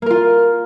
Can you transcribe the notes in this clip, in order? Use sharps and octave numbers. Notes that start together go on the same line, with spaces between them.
A#3 F4 A#4